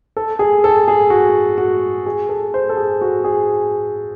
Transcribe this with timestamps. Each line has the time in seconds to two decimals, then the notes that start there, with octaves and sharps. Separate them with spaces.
0.17 A4
0.39 G#4
0.64 A4
0.88 G#4
1.10 F#4
1.58 F#4
2.06 G#4
2.29 A4
2.54 C5
2.69 A4
2.77 G#4
3.01 F#4
3.24 G#4